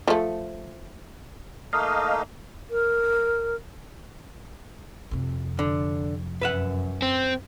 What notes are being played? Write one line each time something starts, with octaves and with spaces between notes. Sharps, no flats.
F3 A3
A3 A#3 D#4 D#5 F5
A#4
F2 C3
D3
F#2 B4 E5 F#5
C4